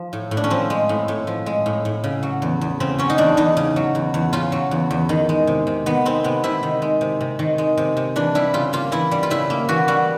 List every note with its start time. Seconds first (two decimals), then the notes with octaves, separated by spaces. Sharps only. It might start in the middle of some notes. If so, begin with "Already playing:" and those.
Already playing: F3
0.13 A2
0.31 A2
0.37 D4
0.44 C#4
0.50 F3 C4
0.70 G#3
0.89 A2
1.08 A2
1.27 F3
1.46 G#3
1.66 A2
1.85 A2
2.04 C#3
2.23 F#3
2.42 E2
2.61 E2
2.80 C#3 C4
2.98 F#3 C#4
3.10 D#4
3.18 E2 D4
3.37 E2 D#4
3.57 C#3
3.76 F#3
3.95 E2
4.14 E2
4.33 C#3 F4
4.52 F#3
4.71 E2
4.91 E2
5.09 D#3
5.29 G#3
5.47 C3
5.67 C3
5.86 D#3 B3
6.05 G#3 C4
6.24 C3 B3
6.44 C3 E4
6.63 D#3
6.82 G#3
7.01 C3
7.21 C3
7.39 D#3
7.58 G#3
7.77 C3
7.97 C3
8.16 E3 D4
8.35 G3 E4
8.54 C#3 F4
8.73 A#3 F4
8.92 E3 E4
9.11 G3
9.23 F4
9.30 C#3 E4
9.50 A#3
9.69 E3 F#4
9.88 G3 F#4